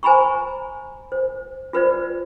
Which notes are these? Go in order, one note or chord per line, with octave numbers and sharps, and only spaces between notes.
C5 G#5 A#5 B5 C#6
C5
F4 B4 C5 D5